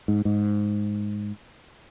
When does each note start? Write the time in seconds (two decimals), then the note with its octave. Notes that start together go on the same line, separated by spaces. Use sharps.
0.08 G#2
0.25 G#2